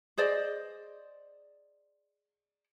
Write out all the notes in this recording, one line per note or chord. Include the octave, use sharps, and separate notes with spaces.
G#4 C5 D5 D#5